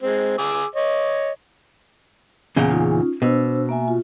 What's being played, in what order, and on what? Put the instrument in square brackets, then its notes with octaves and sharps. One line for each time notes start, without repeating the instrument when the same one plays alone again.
[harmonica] G#3 C4
G#4 D6 E6
C#5 D#5
[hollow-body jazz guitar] E2 A#2 C#3
[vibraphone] C#4 D#4 F4
[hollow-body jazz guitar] B2 [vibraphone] D4 C5 E6
[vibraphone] A#3 E5 G#5
F4